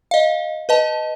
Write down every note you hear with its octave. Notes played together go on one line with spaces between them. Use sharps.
D#5 F5
B4 D#5 A5